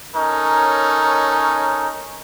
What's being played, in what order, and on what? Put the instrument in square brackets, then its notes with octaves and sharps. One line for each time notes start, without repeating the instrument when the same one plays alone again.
[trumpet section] C#4 D#4 A4 A#4 C#5